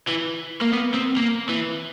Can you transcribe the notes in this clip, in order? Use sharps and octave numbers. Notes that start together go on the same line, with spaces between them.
E3
A#3
B3
C4
A#3
E3